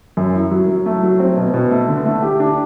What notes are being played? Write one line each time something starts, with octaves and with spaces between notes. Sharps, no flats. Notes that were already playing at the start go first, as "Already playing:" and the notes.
F#2
E4
F#3
F#3
A3
F#3
C4
B2
B2
A3
D3
A3
G4
D4